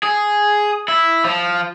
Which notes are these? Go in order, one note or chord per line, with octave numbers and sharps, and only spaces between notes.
G#4
E4
F3